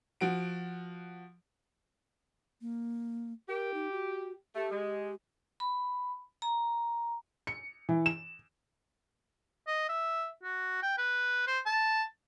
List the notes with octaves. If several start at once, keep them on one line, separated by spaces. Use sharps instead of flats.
F3 F#4 D7
A#3
G4 A#4
D#4
F#4
A3 G4
G#3
B5
A#5
C#7
E3
E7
D#5
E5
F#4
G5
B4
C5
A5